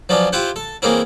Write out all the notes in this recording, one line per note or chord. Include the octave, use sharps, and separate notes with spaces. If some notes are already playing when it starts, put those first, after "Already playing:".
F3 F#3 B3 C#4 D4
E4 F4 G4 C5 F#5
A4
E3 G#3 A#3 C4 C#4 E4